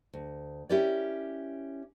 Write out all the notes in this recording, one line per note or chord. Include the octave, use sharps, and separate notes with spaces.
D2
C#4 E4 G4 A#4 D5